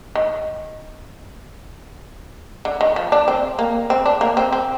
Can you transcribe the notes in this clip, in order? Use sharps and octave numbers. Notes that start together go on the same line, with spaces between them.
D#3
D3
D#3
F3
D4
C4
A#3
C4
D4
A#3
C4
C4